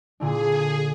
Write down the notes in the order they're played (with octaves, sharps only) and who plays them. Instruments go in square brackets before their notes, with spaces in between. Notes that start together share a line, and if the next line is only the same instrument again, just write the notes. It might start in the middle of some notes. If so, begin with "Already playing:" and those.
[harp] A#2 D3 D4 [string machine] G#4